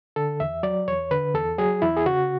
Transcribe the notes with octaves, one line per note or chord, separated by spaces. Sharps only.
D3 A4
E2 E5
F#3 D5
E2 C#5
D3 B4
E2 A4
F#3 G#4
E2 E4
G#4
C#3 F#4